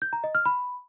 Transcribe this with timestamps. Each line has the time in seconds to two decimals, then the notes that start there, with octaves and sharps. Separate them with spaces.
0.02 G6
0.13 A#5
0.24 D#5
0.35 F6
0.46 B5